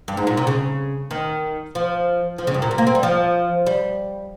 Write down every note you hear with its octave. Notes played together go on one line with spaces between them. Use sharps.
G2
G#2
A#2
C3
C#3
D#3
F3
F3
C#3
G2
A#2
C3
A#3
C4
G3
F3
G3